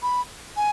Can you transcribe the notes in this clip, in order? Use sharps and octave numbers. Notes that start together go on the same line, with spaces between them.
B5
G#5